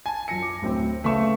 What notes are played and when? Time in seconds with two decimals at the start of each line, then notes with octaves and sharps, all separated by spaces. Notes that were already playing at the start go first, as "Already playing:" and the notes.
0.06 G#5 A5
0.28 F#2 F4 A#6 C#7
0.42 D6
0.61 D2 A2 F#3 C4
1.04 C#3 A3 B3 C4 C#6 E7